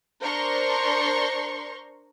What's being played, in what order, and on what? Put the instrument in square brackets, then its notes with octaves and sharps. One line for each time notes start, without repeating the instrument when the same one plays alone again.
[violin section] D4 A#4 C5 A#5 C6 C#6